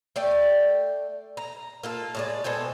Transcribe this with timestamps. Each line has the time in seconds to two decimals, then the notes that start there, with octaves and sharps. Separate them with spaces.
0.16 A3 D5 G5
1.37 A#5
1.83 A#3 F4 A4
2.15 A2 G#3 D5
2.44 B2 C4 A4 G#5